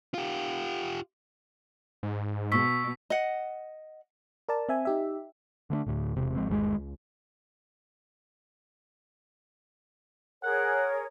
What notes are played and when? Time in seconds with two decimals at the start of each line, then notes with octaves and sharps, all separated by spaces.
0.14 F4 G4
2.03 G#2
2.52 B2 C#6 E6 B6
3.10 D#5 F#5
4.49 A#4 D5 A5
4.69 C4 E5 G#5
4.85 D#4 G4 E5
5.70 D3 A3 C4 D4
5.86 D2 A2
6.16 E1 C3
6.35 G#1 F3 G#3 C4
6.49 G1 D#2 D3 G#3
6.76 C#2
10.43 G#4 A#4 C#5 F#5